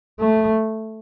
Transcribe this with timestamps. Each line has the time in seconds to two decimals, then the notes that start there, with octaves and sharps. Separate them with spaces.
0.20 A3